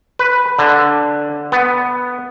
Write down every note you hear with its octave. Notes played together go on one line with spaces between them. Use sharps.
B4
D3
B3